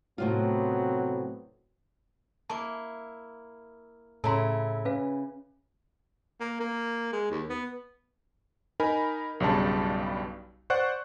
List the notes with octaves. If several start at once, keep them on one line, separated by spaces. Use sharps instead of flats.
A2 C3 F#3 B3 C4 F4
A#3 E4 A5 D6
A2 C#3 E4 A4 E5 A5 A#5 C6
C#4 B4 F5
A#3
A#3
G#3
D#2
B3
D#4 A#4 G#5 B5
B1 G2 C#3 G3 A5
C5 D5 F#5 C#6 F#6